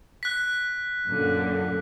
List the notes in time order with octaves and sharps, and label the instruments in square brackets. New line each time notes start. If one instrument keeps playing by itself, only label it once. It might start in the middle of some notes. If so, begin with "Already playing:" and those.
[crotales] F#6 B6
[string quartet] F#2 A#2 D3